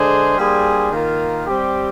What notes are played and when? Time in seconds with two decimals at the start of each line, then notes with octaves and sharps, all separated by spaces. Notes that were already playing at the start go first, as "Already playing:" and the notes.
Already playing: D3 G#3 D4 G#4 C5
0.37 G3 A#3 D4 G#4 C5
0.91 D#3 A#3 F4 A#4
1.46 G3 C4 G4